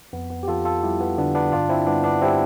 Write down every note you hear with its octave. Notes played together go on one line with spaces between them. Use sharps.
F2 B3
B3
G4
F2 F4 A4
F4 A4
G3 E4 G4
B3
D3 B3 D4
B3 D4
G2 D4 F4
C4 E4
G2 B3 D4
B3 D4
G3 C4 E4